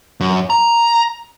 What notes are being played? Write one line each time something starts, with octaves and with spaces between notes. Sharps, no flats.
F#2
A#5